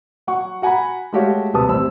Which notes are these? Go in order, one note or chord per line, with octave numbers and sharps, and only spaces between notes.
F#3 F#5 C#6
F#4 F#5 G#5 A#5 B5
G#3 A3 F#4 G4 C#5 F5
D1 C3 B4 A5 D#6
A1 C3 C4 E6